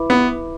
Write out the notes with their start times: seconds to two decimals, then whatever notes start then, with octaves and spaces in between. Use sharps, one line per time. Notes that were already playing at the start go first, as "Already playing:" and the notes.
Already playing: E4 B4 E5 B5 D6
0.10 B3